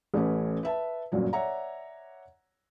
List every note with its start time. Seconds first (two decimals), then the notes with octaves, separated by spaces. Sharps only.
0.14 A1 A3 C#4 B4
0.63 B4 E5 A5
1.12 G1 F#2 A#2 F#3
1.33 C#5 D5 E5 F#5 A#5